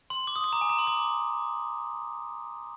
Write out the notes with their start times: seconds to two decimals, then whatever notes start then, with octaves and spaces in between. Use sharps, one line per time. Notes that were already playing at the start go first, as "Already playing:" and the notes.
0.10 C6
0.27 D6
0.36 D#6
0.44 D6
0.53 A#5
0.61 G#5
0.70 A#5
0.79 C6
0.87 D6